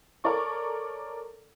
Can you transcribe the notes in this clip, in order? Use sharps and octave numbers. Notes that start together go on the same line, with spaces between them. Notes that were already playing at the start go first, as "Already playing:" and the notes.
A4 A#4 C#5 D5 C#6